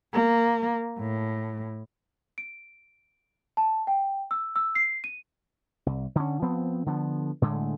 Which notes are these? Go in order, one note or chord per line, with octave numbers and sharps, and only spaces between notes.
A#3
A2
D7
A5
G5
E6
E6
C7
D#7
C2
D3 C#4
F3 B3 C4
D3 F3 B3
A2 D3 G#3 A3